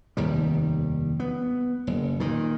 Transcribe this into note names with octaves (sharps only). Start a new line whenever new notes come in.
F1 D#2 D#3 G3
B3
F#1
A#2 D#3